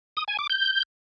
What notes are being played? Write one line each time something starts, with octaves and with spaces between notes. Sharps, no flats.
D#6
G#5
D6
G6